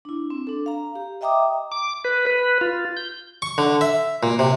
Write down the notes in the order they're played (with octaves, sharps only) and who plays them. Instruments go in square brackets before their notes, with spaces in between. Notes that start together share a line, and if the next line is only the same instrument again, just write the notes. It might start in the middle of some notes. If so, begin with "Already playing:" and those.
[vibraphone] D4 E4
C4
D4 A4
F5 A#5
G4
D#5 E5 G5 A#5 D6 D#6
[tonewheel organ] D6
B4
B4
F4
G6
[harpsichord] C#6
D3
E5
A#2
C3